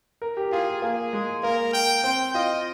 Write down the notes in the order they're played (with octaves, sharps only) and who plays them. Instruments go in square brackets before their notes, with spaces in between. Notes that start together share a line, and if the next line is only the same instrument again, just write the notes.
[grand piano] A#4
G4
[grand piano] F4 [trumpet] G#4
[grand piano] A#3 [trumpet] G#4
[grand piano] G#3
[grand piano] A#3 [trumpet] A#4
[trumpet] G5
[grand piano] C4 [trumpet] G5
[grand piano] F4 [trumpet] D#5